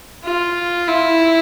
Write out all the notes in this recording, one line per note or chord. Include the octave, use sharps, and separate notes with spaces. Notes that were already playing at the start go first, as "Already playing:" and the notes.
F4
E4